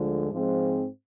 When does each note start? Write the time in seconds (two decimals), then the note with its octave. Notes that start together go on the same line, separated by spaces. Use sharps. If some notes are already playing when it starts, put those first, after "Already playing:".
Already playing: D2 D3 F3 G#3
0.31 G#2 F3 G#3 C4